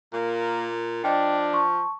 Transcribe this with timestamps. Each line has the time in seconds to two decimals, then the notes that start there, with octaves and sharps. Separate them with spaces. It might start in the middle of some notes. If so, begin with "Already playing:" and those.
0.13 A#2 A#3
1.04 F3 D4 D#5 G5
1.53 A5 C6 C#6